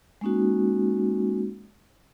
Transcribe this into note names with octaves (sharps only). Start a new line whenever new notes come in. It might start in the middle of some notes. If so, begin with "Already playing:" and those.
G#3 A#3 C#4 D#4 F#4